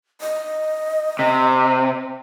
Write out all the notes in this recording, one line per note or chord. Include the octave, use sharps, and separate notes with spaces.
D#5
C3